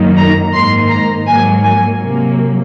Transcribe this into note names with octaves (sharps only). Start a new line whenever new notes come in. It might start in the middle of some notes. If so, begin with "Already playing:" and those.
Already playing: F#2 D#3 F#3 A#3
A#5
G#2 D#3 A#3 C6
A#5
G#2 F#3 A#3 G#5
G#5
C3 F#3 A#3